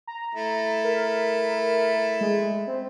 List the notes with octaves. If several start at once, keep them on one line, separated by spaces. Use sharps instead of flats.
A#5
A3 E4
A#4
G#3
C4